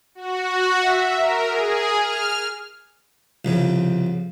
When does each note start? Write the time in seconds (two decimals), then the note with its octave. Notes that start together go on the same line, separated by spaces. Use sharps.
0.15 F#4
0.80 E5
1.14 A#4
1.47 G#4
1.97 F6
3.45 C2 F2 C#3